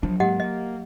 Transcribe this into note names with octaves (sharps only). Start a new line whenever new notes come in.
F3 F#3 D4
G#2 G#3 A#3 G4 D#5 F#5
A#3 D#5